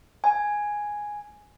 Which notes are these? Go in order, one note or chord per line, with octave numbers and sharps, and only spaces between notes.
G#5